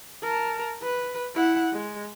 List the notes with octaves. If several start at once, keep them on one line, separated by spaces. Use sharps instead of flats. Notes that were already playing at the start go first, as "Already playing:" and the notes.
A#4 A5
B4
E4 F#5
G#3